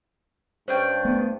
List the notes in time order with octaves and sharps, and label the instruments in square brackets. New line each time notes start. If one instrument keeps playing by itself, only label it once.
[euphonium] G2 [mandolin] C#4 D4 G5 [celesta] C5
[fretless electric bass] A3 B3